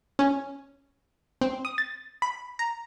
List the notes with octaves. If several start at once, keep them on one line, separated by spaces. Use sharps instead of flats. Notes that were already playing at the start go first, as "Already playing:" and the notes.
C#4
C4
D#6
A6
B5
A#5